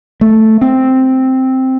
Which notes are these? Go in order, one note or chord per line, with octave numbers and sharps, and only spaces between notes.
A3
C4